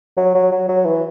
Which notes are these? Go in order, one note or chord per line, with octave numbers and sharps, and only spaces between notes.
F#3
F#3
F#3
F#3
E3